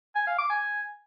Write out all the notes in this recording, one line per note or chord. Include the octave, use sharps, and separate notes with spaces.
G#5
F5
D6
G#5